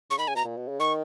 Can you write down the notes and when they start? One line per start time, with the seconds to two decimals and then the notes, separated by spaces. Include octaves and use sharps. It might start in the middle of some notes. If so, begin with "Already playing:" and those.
0.10 C#3 C#6
0.18 D#3 B5
0.27 C#3 G#5
0.36 B2 A#5
0.44 A#2
0.57 B2
0.68 C#3
0.80 D#3 C#6